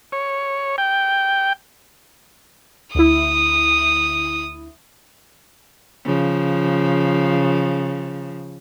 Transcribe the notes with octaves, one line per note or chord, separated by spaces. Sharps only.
C#5
G5
D2 E4 D#6
C#3 F3